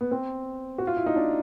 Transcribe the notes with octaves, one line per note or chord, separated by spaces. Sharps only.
B3
C4
F#4
F4
E4
D#4
D4